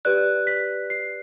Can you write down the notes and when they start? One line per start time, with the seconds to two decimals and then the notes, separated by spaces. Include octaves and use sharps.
0.05 G4 B4 D5 F#6
0.47 B6
0.90 C7